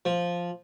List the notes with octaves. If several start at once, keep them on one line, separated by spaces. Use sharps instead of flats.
F3